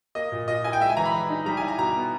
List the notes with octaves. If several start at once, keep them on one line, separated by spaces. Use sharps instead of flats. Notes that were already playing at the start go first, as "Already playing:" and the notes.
A#3 D#5
A#2
A#2 D#5
E4 G#5
G5
G#3 E5
G#5
E3 A#5
B5
E3
D#4
G3 A#5
E4 G#5
A#5
B2 A#5
B3